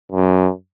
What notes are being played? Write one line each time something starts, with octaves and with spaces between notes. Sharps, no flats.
F#2